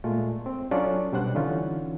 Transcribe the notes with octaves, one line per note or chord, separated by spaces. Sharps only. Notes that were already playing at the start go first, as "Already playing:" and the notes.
A#2 G#3 A3 F4
C4
F#3 C#4 D4 F4 A4 D5
B2 G3 D4 C5 F#5 F#6
D3 E3 C#4 D#4 F4